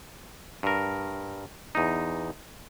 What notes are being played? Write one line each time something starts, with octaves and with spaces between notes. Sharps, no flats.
G2 A#4
E2 D#4